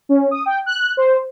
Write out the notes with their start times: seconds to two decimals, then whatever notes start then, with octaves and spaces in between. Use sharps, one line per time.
0.09 C#4
0.31 D#6
0.46 G5
0.66 F#6
0.97 C5